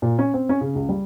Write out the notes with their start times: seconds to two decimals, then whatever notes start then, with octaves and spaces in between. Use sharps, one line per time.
0.02 A#2
0.19 C#4
0.34 C4
0.49 C#4
0.61 C#3
0.75 C#2
0.89 G3